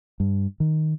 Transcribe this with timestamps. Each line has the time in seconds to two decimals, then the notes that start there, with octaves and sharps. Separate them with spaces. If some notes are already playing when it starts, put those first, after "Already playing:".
0.20 G2
0.60 D#3